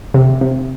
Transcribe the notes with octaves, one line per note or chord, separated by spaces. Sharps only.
C3
C3